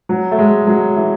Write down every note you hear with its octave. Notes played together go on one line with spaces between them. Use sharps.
F#3
A3
G#3
F#3
E3